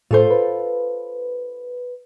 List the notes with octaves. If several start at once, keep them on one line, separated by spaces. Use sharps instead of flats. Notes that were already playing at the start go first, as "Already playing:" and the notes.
A2 F4 A4 C5
B4